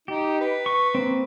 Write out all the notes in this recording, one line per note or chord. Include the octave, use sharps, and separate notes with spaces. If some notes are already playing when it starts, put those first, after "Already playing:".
D#4 G4
B4
C#6
A#3 C4